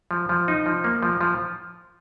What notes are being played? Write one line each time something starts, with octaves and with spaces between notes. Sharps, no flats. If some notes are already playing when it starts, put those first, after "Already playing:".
F3
F3
D#4
F3
A#3
F3
F3